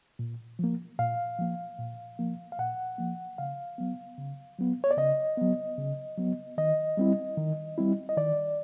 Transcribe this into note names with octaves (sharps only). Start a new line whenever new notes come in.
A#2
F3 A#3
A#2 F5
F3 A#3
A#2
F3 A#3
F5
A#2 F#5
F3 A#3
C#3 F5
F#3 B3
C#3
F#3 B3
C#5
D5
C#3 D#5
F#3 B3
C#3
F#3 B3
D#3 D#5
G3 C4 E4
D#3
G3 C4 E4
D#5
D#3 D5